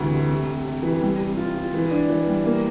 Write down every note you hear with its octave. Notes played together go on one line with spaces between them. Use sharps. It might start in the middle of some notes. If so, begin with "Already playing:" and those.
Already playing: D2 C3 E3
A3
C3
C3
C3
E3
G3
C3
F4
F4
E3
D4
E3
G3
A#3